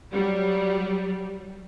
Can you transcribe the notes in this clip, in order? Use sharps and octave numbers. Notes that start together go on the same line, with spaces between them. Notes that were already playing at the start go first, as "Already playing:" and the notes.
F#3 G3